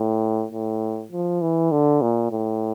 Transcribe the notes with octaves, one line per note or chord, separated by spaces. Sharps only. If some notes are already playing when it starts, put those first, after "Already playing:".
Already playing: A2
A2
F3
E3
D3
A#2
A2